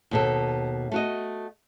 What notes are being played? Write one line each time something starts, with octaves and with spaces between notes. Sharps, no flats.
D#2 B2 A4
A3 F#4 D#5